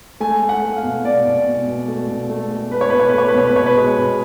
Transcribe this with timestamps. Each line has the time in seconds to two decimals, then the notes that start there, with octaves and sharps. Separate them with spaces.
0.20 A3 G#5
0.42 A3
0.49 F#5
0.62 A3
0.76 F5
0.83 B2
1.04 B2 D5
1.25 B2
1.46 B2
1.68 B2
1.88 A3
2.08 B2
2.29 A3
2.51 A3
2.71 A3 B4
2.81 C#5
2.90 B2 B4
3.00 C#5
3.09 B4
3.13 A3 C#5
3.28 B4
3.35 B2 C#5
3.47 B4
3.55 B2 C#5
3.66 B4
3.76 G#3
3.97 B2